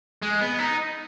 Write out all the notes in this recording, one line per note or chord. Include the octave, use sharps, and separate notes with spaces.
G#3
B3
D#4